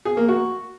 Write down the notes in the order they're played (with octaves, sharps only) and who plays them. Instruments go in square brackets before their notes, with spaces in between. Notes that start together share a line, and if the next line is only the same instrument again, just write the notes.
[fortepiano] G#4
A#3
F#4